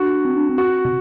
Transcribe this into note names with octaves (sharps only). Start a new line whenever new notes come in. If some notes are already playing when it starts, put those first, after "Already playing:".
Already playing: D4 F#4
C4
D4
C4
F#4
C3